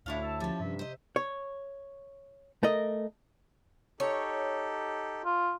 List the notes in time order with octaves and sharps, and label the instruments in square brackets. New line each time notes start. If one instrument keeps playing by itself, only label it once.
[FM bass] D2 [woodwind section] A2 D4 [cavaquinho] E4 C#5 F5
[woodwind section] A5 E6
[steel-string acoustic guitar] F3 C#4 [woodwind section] F4 G4 A5
[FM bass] G2 [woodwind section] C3 E5
[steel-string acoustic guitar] C5 D#5
[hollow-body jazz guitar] C#5
A3 A#4 D#5
[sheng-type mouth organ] D#4 G4 A4 [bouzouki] C#5
[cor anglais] F4